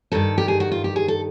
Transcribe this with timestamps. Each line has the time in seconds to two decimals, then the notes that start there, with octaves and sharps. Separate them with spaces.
0.12 G2 D#3 A4
0.38 G4
0.48 G#4
0.60 F#4
0.72 F4
0.84 G4
0.96 G#4
1.08 A4